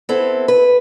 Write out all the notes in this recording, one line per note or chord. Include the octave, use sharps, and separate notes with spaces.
B3 C4 E4 A4
B4